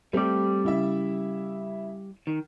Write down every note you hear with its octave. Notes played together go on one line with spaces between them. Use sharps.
G3 A3 C4 G4 D5
C#3 E4 E5
D#3